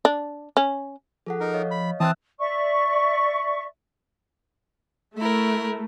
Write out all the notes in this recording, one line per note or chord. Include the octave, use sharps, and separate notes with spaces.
D4
C#4
F3 G#4 A4 F#5
D#4 A#4
C#5 D#5 F5
B5
E3 C4 E5 A5 D#6 E6 F#6
D5 E5 C#6
A3 E4 A#4